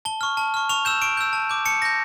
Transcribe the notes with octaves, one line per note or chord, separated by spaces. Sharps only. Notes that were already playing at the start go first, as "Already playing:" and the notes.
A5 G7
C#6 F6
A5
C#6 F6
C#6 F7
E6 G6 E7
C#6 D7
E6 G6
A5
D6 G6
A5 C#7
D6 G6 A#6